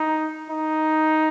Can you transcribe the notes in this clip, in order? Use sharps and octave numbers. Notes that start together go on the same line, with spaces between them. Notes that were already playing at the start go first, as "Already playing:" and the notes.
Already playing: D#4
D#4